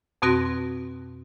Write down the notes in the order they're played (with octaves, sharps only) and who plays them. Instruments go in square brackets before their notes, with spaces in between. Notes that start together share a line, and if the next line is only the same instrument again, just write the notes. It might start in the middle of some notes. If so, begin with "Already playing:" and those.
[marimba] F2 B2 C4 F#4 C6 A#6